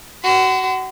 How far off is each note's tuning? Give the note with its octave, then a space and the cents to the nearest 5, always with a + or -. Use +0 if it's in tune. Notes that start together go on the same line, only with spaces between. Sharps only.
F#4 +25 C6 -40